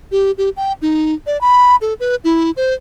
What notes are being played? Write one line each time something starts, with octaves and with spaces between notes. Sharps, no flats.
G4
G4
G5
D#4
D5
B5
A4
B4
E4
C5